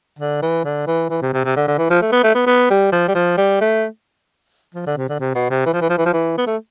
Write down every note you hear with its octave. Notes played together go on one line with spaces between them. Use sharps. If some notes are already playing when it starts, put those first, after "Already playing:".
D3
E3
D3
E3
E3
C3
C3
C3
D3
D3
E3
F3
A3
B3
A3
B3
B3
G3
F3
G3
F3
G3
A3
F3
D3
C3
D3
C3
B2
C3
E3
F3
E3
F3
E3
F3
E3
B3
A3